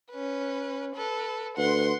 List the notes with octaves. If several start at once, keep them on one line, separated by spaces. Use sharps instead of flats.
C#4 B4
A4 B4
D2 B4 F#5 C6